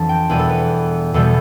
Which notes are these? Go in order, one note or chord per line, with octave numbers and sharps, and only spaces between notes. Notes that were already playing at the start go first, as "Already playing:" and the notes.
Already playing: F2 E3 B3 D4 A5
G5
E2 B2 G3 B4
A4
B4
E2 B2 G3 A4